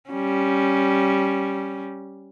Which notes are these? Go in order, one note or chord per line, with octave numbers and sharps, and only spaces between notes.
G3 C#4